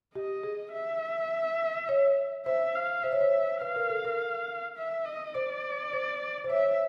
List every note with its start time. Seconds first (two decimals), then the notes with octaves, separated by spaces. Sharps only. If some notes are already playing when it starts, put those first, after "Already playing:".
0.15 G4 D#5
0.43 G#4
0.73 E5
1.89 C#5
2.46 C5 E5
2.75 F5
3.03 C5 E5
3.12 C#5
3.21 C5
3.61 B4 F5
3.76 A#4
3.90 A4
4.05 A#4
4.77 E5
5.05 D#5
5.35 C5 D5
5.93 C5
6.44 C5
6.50 C#5 E5